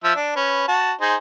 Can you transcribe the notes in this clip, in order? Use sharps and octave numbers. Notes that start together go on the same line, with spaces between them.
F3 E5
D4
C#4 B4
F#4 A5
D#4 G#4 C5